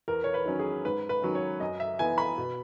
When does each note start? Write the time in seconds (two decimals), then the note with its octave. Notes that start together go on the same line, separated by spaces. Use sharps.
0.08 E2 A#4
0.24 C#5
0.34 B4
0.46 D#3 F#3 C#4
0.59 G#4
0.84 G#2 B4
1.09 B4
1.22 D#3 F#3 C#4
1.35 C#5
1.60 F#2 D#5
1.80 E5
1.99 E3 B3 G#5
2.18 B5
2.38 B2